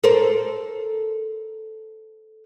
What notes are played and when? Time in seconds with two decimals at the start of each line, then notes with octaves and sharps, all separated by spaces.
0.04 A4 A#4 C5